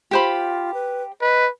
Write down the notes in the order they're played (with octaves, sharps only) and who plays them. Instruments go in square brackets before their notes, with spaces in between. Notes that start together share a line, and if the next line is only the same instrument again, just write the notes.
[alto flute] F4 [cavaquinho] G4 C5 B5
[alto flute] B4
[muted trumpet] B4 [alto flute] D#5